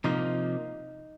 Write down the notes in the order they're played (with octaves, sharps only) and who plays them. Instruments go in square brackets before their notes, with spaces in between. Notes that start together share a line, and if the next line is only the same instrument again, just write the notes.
[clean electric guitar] C3 F3 A#3 [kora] D#4